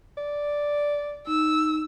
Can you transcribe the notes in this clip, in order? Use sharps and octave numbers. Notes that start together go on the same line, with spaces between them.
D5
D#4 E6